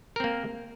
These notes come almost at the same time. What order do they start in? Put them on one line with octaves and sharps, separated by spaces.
A#4 C4 A#3